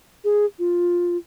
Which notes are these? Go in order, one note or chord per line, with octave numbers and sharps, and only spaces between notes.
G#4
F4